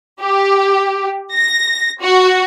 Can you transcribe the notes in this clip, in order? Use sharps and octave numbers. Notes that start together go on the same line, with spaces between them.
G4
A#6
F#4